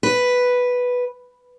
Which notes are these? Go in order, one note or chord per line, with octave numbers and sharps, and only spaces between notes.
B4